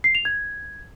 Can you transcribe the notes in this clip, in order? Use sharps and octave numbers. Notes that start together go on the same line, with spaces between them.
C7
F7
G#6